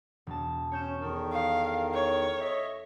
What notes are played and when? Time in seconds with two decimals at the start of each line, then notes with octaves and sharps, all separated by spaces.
0.27 E1 A5
0.72 C#4 C#5 G6 E7
1.01 E2 D#3 D#4 A4 A#4
1.33 F5
1.95 C#5
2.40 D#5 E5